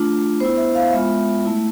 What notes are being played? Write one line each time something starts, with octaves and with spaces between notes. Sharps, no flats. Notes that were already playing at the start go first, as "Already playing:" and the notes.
Already playing: A3 D4 F4
B3 E4 C5
E5
F5
G#3 B3 F4 E5
A3 E4